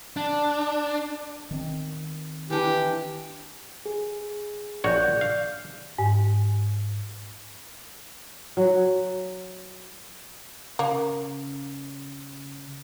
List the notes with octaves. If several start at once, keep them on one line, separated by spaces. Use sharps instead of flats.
D4
D#3 C4
E3 D4 G4
G#4
A#1 F#4 C#5 D5 F#6 G6
F5
G#2
F#3
C#3 A#3